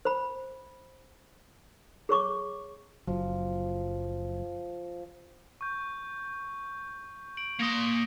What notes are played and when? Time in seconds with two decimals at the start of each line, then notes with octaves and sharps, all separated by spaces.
0.05 C5 B5
2.09 G#4 C#5 C#6 D6
3.07 F#1 F3 F#3
5.61 C#6 G6
7.37 D7 F#7
7.59 A#3 C6 D#6 A#6 C#7